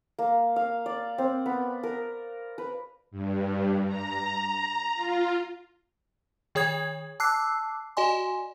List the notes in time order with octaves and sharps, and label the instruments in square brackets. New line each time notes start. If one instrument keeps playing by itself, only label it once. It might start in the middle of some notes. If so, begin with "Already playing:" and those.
[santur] A#3
F5
D5
C4
B3
A#4
B4
[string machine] G2
A#5
F4
[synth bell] D#3 G#4 C#5 D#6 G#6
A5 D6 E6 F#6 C7
F#4 D5 D#5 G#5 C6